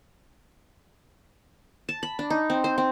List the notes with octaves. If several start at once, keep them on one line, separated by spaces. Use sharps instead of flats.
A5
B5
D4
D#4
C4
C5
C4